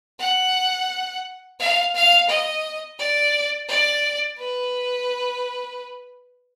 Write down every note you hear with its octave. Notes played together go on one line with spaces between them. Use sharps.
F#5
F5
F5
D#5
D5
D5
B4